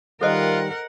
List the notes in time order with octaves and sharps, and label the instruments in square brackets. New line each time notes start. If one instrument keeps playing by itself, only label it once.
[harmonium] D#3 G3 [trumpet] F4 [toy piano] A4 C5 D#5 [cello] A#4 F#5